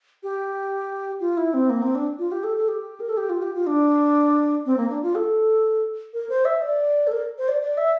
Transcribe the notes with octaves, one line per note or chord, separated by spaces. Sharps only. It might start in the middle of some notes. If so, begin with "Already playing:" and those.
G4
F4
E4
C4
A#3
C4
D4
F4
G4
A4
A4
G4
A#4
A4
G4
F4
G4
F4
D4
C4
A#3
D4
F4
A4
A#4
C5
E5
D5
A4
A#4
C5
D5
D5
E5